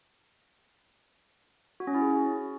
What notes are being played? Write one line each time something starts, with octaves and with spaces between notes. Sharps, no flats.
F#4
C#4
E4
G#4